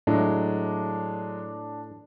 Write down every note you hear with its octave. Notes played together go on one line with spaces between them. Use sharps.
A2 F#3 G#3 D4